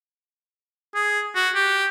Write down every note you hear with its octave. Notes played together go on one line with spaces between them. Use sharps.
G#4
F#4
G4